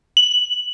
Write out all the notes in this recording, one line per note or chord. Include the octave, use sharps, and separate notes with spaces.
F#7